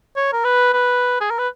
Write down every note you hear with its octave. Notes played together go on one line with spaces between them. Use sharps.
C#5
A#4
B4
B4
G#4
A#4
B4